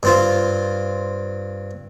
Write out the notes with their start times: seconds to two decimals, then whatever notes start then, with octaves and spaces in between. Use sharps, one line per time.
0.03 G2 C4 F4